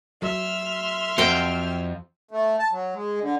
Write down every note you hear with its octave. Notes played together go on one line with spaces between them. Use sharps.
F#3 E5 C6 F6
F2 F#4 C5 F5 G5
A3
A5
F#3
G#3
D3